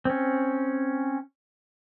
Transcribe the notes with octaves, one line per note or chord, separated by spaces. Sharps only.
C4 C#4